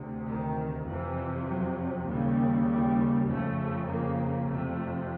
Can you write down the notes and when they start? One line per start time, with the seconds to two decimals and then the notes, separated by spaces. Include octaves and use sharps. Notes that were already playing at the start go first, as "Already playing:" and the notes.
Already playing: D2 C3
0.26 D#3
0.86 F2 C3 E3
1.46 F#3
2.06 D#2 C#3 G3
2.66 G3
3.27 F2 C#3 A3
3.87 A#3
4.47 F2 C3 A3